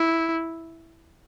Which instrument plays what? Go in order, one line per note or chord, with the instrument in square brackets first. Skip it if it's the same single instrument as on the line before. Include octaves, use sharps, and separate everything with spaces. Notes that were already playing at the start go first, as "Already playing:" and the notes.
Already playing: [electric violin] E4